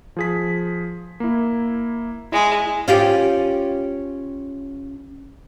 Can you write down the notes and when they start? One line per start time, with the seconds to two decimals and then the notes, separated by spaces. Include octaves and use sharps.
0.17 F3 G#4 B6
1.20 A#3 E4
2.32 G#3 E4
2.88 C#4 F4 G4